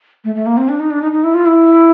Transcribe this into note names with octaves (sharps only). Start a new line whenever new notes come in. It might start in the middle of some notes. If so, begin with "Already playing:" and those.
A3
A3
A#3
C4
D4
D#4
D4
D#4
D#4
E4
F4
E4